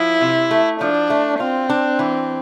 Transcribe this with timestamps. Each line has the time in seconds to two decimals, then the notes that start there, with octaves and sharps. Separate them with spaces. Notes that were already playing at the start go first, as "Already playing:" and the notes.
Already playing: F3 E4
0.21 C3
0.51 A3
0.80 F3 D4
1.10 A3
1.40 C4 F4
1.70 D4
1.99 E3